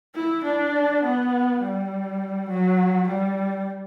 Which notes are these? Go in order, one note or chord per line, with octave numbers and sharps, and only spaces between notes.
E4
D4
B3
G3
F#3
G3